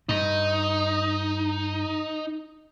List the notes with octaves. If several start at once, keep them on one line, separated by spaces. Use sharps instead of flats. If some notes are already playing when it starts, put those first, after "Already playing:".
G2 D#4